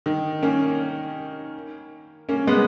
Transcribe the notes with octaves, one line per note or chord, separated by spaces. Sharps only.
D#3
A#3 C#4
A#3 C#4
G#3 B3